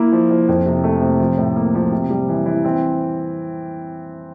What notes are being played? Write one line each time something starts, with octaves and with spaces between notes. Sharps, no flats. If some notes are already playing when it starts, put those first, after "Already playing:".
Already playing: A#3 E4
F3
F3
F2
C3
A3
C3
F3
A2
A#3
F3
C3
G3
E3
E3
C4